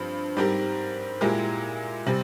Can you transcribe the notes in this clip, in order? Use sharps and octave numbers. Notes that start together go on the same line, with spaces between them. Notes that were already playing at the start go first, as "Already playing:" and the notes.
Already playing: G2 F3 C4
G#2 G3 C4 G4 A#4
A#2 G#3 E4 G4 A#4
C3 G3 C4